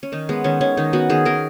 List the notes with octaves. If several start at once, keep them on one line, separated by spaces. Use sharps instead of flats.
C#4
D#3 D#4
G#3 B3
D#3 C#4
D#3 C#4
D#3 D#4
B3 F#4
D#3 G#4
D#3 A#4